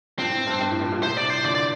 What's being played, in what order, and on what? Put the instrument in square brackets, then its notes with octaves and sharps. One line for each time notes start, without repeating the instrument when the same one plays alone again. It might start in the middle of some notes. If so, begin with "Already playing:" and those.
[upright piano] G2 A#2 [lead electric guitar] C4
[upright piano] A2
G2
G2
A2
G2 A#2
G2 A#2
[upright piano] A2 C3 [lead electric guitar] C5
[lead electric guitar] D5
C5
[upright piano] A#2 D3 [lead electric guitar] D5
[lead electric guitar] D5